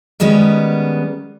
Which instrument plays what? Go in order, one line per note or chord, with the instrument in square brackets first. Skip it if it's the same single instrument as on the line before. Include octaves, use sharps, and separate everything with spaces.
[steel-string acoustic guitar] D#3 G3 G#3 B3 C#4